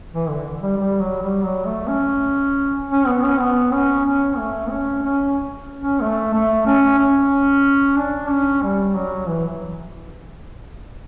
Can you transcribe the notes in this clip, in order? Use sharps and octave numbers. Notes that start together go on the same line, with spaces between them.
E3
D3
G3
G3
F#3
G3
F#3
A3
C#4
C#4
B3
C#4
B3
C#4
C#4
A3
C#4
C#4
C#4
A3
A3
C#4
C#4
D4
C#4
G3
F#3
E3